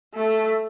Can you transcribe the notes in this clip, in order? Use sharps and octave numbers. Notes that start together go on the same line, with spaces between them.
A3